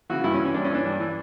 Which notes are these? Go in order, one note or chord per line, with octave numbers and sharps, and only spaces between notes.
C#3 E3 F#4
G2 E4
C#4
E3
C#4
G2 D4
C#4
E3 D4
G2
E3